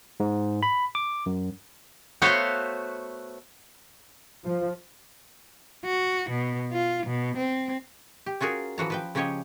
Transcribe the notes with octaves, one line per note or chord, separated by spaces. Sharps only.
G#2
B5
D6
F#2
A3 B3 F#4 C5 C#5 F5
F3
F#4
B2
F4
B2
C4
G4
C#4 F4 F#4 G#4 A#4
E3 F3 F#4 A#5
F3 B4 G5
C#3 F3 C#4 G4 C#5 D#5